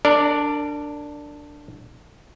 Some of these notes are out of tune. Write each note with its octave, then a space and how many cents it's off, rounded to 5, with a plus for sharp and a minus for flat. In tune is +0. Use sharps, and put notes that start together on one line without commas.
D4 +0 A#4 -35 D5 +0